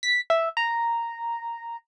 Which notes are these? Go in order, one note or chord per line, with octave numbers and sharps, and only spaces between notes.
B6
E5
A#5